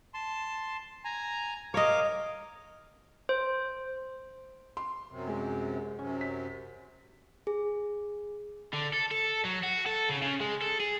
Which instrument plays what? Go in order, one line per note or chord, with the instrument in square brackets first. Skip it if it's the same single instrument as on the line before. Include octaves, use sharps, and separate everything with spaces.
[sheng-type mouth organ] A5 C6
G#5 A#5
[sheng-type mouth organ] A#4 F5 D6 [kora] C#5 D#5
[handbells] C5
[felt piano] C6
[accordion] F#2 C3
[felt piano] G#3
[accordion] F#2 C3 [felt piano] C#4
[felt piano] B6
[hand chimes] G#4
[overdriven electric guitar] D3
A4
A4
F#3
F#4
A4
C#3
C#3
G#3
A4
G#4